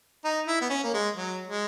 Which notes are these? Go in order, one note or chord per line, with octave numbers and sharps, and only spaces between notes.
D#4
E4
B3
C#4
A#3
G#3
F#3
G#3